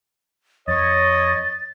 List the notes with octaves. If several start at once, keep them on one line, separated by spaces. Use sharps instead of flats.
F2 C#5 D#5 A6